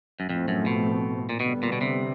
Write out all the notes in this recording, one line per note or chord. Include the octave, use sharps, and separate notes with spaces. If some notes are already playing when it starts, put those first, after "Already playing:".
F#2
F2 A2 F3 A3 C4
F#2
B2
A#2
B2 D3 G3 B3
A#2
B2
C3